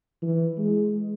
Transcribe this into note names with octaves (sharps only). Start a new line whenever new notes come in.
E3
G#3